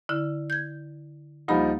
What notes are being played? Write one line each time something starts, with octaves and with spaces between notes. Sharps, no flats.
D3 E4 F6
G6 G#6
D2 F3 G3 A#3 D#4 B5